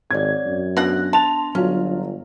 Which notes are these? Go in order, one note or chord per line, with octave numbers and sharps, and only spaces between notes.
G#1 C4 C#5 D5 G#6
F#2
B2 B3 D4 F#5 A#6
A5 C6 F7
G1 F#3 C#4 F4